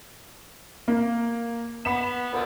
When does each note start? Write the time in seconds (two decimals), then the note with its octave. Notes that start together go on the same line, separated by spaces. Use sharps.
0.88 A#3
1.85 B3 B5 B6 E7
2.32 D2 A#2 D3